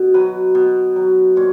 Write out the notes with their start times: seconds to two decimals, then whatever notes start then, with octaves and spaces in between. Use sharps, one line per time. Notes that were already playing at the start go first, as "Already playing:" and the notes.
Already playing: B2
0.14 F#3 B4
0.55 B2
0.96 F#3
1.36 A#2 C#5